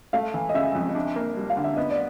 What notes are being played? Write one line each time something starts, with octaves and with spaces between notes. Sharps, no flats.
A3 F5
E3
D#5
C#3 E5
F2
D4
A#3
G3
F5
D3
E5
B3 D#5
D5